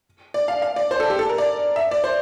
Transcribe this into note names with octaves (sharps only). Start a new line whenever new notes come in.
D5
F5
F5
D5
C5
A4
G4
A4
A#4
D5
E5
D5
C5